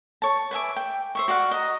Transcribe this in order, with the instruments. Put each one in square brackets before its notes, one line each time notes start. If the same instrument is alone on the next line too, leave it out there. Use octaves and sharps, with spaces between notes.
[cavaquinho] C#5 A5
B4 E5 G#5 D6
G5
C5 E5 C#6
F#4 D5 F5 F#5
D#5 A#5